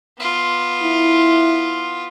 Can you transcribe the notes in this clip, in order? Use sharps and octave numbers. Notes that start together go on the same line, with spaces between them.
B3 F4
E4